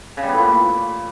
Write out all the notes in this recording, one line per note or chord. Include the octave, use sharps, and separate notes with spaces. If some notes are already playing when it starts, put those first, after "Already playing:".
C#3
G3
B3
A2
A#2